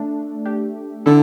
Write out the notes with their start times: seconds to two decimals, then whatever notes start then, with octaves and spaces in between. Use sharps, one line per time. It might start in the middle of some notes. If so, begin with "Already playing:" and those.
Already playing: A3 D4
0.45 D4 G4
1.06 D3 E4 A4